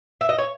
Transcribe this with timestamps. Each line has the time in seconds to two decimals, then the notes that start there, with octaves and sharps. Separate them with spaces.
0.21 E5
0.29 D#5
0.38 C#5